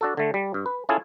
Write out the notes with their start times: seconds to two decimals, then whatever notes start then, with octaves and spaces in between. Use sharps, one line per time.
0.01 D4 F#4 A4
0.17 D3 A3
0.34 G3
0.54 G2
0.66 B4
0.89 C#4 E4 F4 G#4 A4